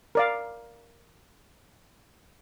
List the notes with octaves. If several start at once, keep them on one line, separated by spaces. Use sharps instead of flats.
A#4 D5 F5